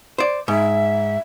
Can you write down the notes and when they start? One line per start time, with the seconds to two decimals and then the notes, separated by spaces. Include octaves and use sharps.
0.18 C5 D5
0.48 G#2 E5